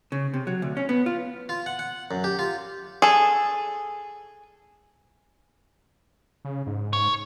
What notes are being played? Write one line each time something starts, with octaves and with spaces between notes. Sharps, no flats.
C#3
C3
F#3
D2
C#4
B3
F4
F4
F#5
F#5
F#2
G4
F4
G#4 A4
C#3
G#2
C#5